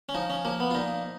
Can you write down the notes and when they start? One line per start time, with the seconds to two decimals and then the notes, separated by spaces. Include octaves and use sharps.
0.09 C#4
0.15 F3 D#4
0.30 C#4
0.45 F3 A#3
0.60 B3
0.71 F4
0.75 A#2 D#4